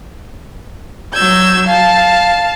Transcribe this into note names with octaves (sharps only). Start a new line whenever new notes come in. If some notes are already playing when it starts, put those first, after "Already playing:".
F#3 E6 G6 G#6
F5 A5